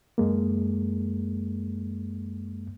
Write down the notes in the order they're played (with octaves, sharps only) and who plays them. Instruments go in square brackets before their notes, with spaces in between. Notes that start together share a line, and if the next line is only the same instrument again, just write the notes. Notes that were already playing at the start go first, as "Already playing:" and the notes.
[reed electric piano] F#2 G#3 A#3